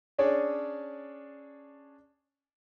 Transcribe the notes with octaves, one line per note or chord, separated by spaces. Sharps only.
C#4 D4 G#4 C#5 D5